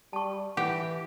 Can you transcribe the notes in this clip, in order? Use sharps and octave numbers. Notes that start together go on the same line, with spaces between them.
G3 A5 C#6
E3 G4 F#5